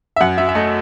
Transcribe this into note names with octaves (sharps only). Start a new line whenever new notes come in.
E5
F#2 F#5
F#3 E5
E5
A3 D#5